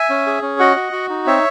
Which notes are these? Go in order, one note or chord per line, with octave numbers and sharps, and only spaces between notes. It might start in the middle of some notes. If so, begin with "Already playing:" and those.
Already playing: E5 G#5
C#4
G#4
C#4
F#4 D#5 F#5
F#4
F#4
D#4
C4 C#5 E5